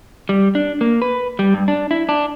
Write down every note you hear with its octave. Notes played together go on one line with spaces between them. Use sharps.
G3
D4
A#3
B4
G3
G2
D4
E4
D4